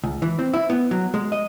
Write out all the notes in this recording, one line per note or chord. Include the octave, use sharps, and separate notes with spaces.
C#2
E3
C4
E4
B3
F#3
G#3
D#5